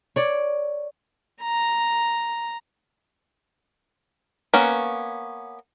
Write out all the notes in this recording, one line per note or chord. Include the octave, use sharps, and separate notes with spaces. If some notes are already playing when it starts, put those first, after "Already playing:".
C#5 D5
A#5
A#3 B3 C#4 C#5